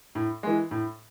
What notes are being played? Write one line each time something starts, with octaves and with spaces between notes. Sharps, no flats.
A2
E3 G#3
A2